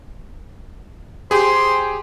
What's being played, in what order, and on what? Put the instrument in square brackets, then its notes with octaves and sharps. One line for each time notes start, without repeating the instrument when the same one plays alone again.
[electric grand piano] G4 G#4 [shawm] C5